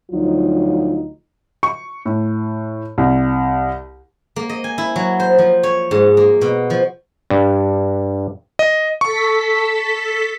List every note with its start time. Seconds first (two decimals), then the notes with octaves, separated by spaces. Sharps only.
0.11 D2 F3 F#3 D#4 F4
1.63 C#6
2.06 A2
2.98 C2
4.36 A#3
4.49 D#5
4.64 G#5
4.78 E4
4.96 F#3
5.20 C5
5.38 F3
5.63 C#5
5.91 G#2
6.17 A#3
6.41 B2
6.70 F3
7.30 G2
8.59 D#5
9.01 A4 C#6 B6